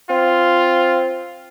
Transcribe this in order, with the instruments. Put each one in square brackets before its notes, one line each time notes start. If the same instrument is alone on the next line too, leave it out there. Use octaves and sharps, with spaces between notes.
[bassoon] C4 [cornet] F4